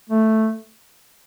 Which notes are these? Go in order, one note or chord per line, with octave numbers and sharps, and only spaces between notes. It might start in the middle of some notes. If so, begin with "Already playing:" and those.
A3